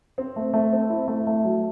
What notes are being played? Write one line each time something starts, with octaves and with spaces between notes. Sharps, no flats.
C4
A3
A3
C4
E4
A3
A3
F#3